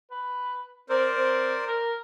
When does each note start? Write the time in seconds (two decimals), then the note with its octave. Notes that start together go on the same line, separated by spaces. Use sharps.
0.11 B4
0.89 C4 A#4 C5 D5
1.16 C4
1.68 A#4